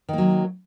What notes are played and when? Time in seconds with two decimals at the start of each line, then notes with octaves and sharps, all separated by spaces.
0.09 D#3
0.13 A#3
0.18 F#3